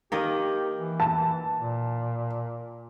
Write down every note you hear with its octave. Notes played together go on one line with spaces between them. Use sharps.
D#3 A#3 G4 D#5
E3
A5
A#2